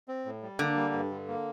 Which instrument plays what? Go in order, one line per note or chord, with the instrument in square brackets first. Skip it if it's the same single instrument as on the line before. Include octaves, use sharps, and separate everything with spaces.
[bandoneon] C4
A2
G3
[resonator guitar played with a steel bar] D3 [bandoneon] A#3
[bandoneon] G3
G2
D3
A#3